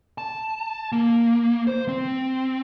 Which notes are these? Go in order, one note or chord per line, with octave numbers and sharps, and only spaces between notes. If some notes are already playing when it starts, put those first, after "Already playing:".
A5
A#3
C5
C4